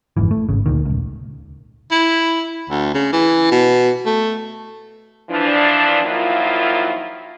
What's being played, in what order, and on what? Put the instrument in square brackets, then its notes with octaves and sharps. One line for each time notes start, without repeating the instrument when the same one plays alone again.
[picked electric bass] G1 F2 G#2 E3
A3
G#1 C#3
D2 A#2 D#3
D#1 C#2
[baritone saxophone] E4
D2
C#3
E3
B2
A3
[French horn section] E3 F3 D4
D#3 F3 F#3 A#3 E4 F4